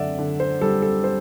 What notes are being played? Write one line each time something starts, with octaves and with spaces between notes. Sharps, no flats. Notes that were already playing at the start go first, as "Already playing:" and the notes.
Already playing: F#2 D3 D5 E5 F#5
D3
C5
G3 A4
A4
C5